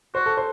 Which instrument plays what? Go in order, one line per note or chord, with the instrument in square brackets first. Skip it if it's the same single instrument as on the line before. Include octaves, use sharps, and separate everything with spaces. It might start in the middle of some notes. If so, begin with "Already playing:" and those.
[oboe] F#4 [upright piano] C5
[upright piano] A4
C5